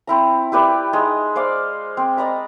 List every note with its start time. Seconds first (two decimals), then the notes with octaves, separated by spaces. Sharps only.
0.07 C4 E4 A#5
0.52 E4 G4 B4 D5
0.93 G#3 D#4 D#6
1.35 C5 D5 F5 D6
1.97 C4
2.17 D5 D#5 A#5 B5